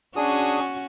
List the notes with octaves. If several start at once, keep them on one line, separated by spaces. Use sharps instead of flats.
C#4 D4 F#4 G#4 D#6